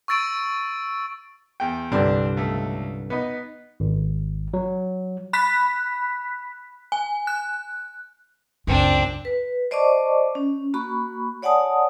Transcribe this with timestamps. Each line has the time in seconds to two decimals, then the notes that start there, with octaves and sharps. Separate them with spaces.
0.08 C#6 E6 A6 D7 D#7
1.60 E2 G5
1.92 C2 G2 D3 C4 D4
2.37 C#2 A3
3.10 B3 D#4
3.80 G#1
4.54 F#3
5.33 B5 F#6 B6
6.92 G#5
7.27 F#6
8.67 C#2 F#2 C4 D4
9.25 B4
9.71 C5 D5 D#5 A5 C#6 D6
10.35 C#4
10.74 A#3 F#4 B5 C#6
11.42 C#5 D5 F#5 G#5 A5 D#6